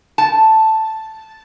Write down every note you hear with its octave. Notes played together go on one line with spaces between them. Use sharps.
A5